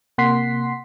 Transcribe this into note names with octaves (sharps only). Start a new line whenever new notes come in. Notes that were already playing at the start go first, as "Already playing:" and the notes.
C3 A#3 F#5 C6 B6 C7